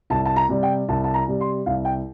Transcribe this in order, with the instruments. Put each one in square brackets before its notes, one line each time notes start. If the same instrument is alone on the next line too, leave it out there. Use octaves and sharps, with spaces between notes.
[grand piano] C2 A5
A5
A#5
C3 G3
G5
C2 A5
A5
A#5
C3 G3
C6
C2 F5
G5